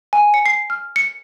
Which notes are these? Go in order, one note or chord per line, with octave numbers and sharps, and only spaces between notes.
G#5
C#7
C7
F6
C#7